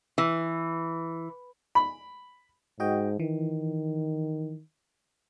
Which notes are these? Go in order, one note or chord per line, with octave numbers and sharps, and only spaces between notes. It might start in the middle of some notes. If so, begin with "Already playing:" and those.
E3
B5
G#2 F#4 D#5 G5
D#3 E3